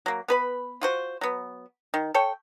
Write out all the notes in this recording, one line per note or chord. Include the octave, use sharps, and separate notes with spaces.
F#3 A#3
B3 B4 B5
F4 F#4 C5
F#3 B3
D#3
A4 C#5 G5